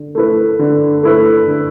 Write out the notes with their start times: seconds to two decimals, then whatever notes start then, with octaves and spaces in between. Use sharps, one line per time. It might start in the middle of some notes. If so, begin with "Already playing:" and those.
Already playing: D3
0.15 A3 E4 B4
0.59 D3
1.03 A3 E4 B4
1.47 D3